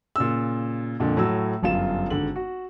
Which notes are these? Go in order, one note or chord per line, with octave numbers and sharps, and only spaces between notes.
A#2 C#3 E6
F2 A#2 D3
A2 F#3 E6
G1 F#2 F4 E7
G#1 D3 F#7
F#4